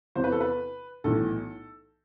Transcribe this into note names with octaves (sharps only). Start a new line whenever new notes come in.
E2 C3 E3 C5
B4
A4
B4
B1 A2 E3 A4